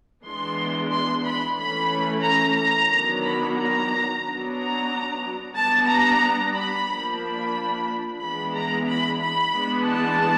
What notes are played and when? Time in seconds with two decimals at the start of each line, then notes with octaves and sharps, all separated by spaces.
0.25 E3 G#3 B3 D4 C6
0.91 C6
1.24 B5
1.57 E3 A3 C#4 B5
2.23 A#5
2.57 A#5
2.90 D#3 F#3 B3 D4
3.23 B5
3.56 A#5
4.23 F#3 B3 D4
4.55 A#5
5.55 G3 B3 D4 A5
5.88 A#5
6.55 B5
6.88 F3 A#3 D4
7.21 B5
8.20 E3 G#3 B3 D4 B5
8.54 A#5
8.87 B5
9.20 B5
9.53 E3 G#3 B3 D4
9.86 A5